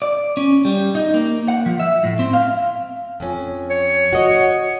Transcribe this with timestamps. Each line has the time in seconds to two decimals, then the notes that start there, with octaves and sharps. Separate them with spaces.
0.02 D5
0.37 C#4
0.65 G3
0.95 D#4
1.14 A#3
1.48 F#5
1.66 F3
1.80 E5
2.04 A2
2.19 C4
2.33 F5
3.20 F2 C#4
3.70 C#5
4.13 F#4 D#5